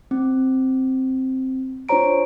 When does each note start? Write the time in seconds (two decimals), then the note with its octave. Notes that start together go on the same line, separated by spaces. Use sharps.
0.11 C4
1.89 D4 F4 C5 C#5 A#5 D7